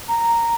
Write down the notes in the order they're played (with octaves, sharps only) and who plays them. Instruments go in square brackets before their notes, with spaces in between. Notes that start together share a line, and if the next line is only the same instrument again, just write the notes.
[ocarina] A#5